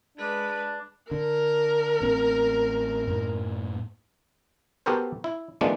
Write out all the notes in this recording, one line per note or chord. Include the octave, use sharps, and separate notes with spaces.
G#3 D4 B4
D3 A#4
A1 C4
F#2 A2
B3 F#4 G4 A4 A#4 C5
E4
D#3 F3 G#3 A3 B3 D4